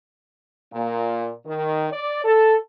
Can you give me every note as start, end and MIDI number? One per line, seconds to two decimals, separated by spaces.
0.73 1.31 46
1.46 1.87 51
1.90 2.21 74
2.25 2.56 69